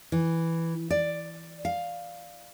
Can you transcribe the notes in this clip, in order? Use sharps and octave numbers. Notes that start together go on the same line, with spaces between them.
E3
D5
F5